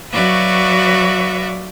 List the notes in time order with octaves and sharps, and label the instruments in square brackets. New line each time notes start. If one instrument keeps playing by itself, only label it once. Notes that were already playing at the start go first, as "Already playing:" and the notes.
[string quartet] F#3 F#4 B4 D5 E5 F5